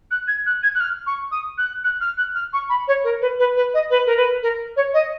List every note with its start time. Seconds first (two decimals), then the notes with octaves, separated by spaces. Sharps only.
0.11 F#6
0.28 G#6
0.46 F#6
0.63 G#6
0.75 F#6
0.80 F6
1.07 C#6
1.32 D#6
1.58 F#6
1.84 F#6
2.01 F6
2.18 F#6
2.35 F6
2.53 C#6
2.69 B5
2.88 C#5
3.04 A#4
3.21 B4
3.39 B4
3.56 B4
3.74 D#5
3.90 B4
4.06 A#4
4.17 B4
4.43 A#4
4.76 C#5
4.94 D#5